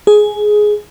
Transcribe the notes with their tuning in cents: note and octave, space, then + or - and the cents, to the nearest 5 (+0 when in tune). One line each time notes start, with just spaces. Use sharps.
G#4 +10